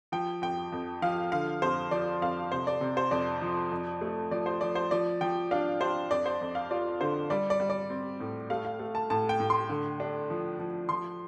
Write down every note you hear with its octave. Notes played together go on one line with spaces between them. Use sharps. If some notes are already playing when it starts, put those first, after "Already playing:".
F3 G5
F2 G5
F2
F3 F5
D3 F5
F2 C5
F3 D5
F2 F5
C3 C5
D5
C3
C5
F2 D5
F3
F2
A3
F3 D5
C5
F3 D5
C5
F3 D5
F3 G5
D4 F5
D4 C5
F2 D5
C5
F2
F5
F4 D5
D3 C5
G3 D5
D5
G3
D5
C4
A2
A3 F5
F5
A3
A5
A2 A5
G5
A2
C6
D3
D4
F3
F3
F3 C6